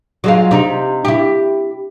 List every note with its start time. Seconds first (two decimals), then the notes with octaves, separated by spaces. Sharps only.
0.24 F#3 G#3 F4
0.51 C3 D#4
1.05 E4 G4